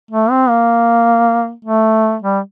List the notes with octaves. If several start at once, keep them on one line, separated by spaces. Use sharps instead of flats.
A3
C4
A#3
A3
G3